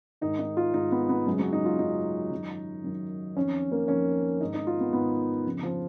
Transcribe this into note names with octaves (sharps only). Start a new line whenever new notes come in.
G#2 D#3 D#4
D#4
F4
G#2 D#3 D#4
B3
B3
F#2 C#3 G#3
F#3
D#4
F4
F#2 C#3 D#4
F#2 D#3
F#2 D#3
F2 D#3 C#4
A#3
F2 D#3 C#4
G#2 D#3 D#4
D#4
F4
B3
G#2 D#3 B3
F2 C#3
F3